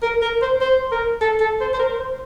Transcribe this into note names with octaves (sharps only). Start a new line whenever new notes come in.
A#4
A#4
C5
C5
A#4
A4
A4
C5
C5
A#4
C5